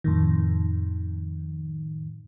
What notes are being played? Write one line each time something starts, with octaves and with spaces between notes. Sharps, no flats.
F2 A2 D#3